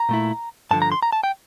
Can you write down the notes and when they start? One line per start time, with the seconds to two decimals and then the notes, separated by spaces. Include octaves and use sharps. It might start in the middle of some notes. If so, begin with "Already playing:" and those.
Already playing: A#5
0.09 A#2 A3 E4
0.71 G2 D3 F3 A5
0.82 A#5
0.92 C6
1.03 A#5
1.12 A5
1.24 G5